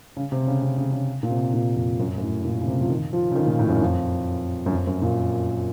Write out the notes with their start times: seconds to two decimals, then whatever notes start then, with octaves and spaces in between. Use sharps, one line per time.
0.17 C#3
0.32 C3
0.47 C#3
0.62 C3
0.78 C#3
0.93 C#3
1.23 A#2
1.30 C3
1.54 A#2
1.76 F2
2.00 F#2
2.18 F#2
2.22 A2
2.45 A#2
2.61 C#3
2.67 C3
2.81 F3
2.90 D#3
3.13 F3
3.32 C#3
3.35 D#3
3.46 A#2
3.59 A2
3.69 F#2
3.82 F2
4.66 F#2
4.72 F2
4.87 F#2
5.02 A#2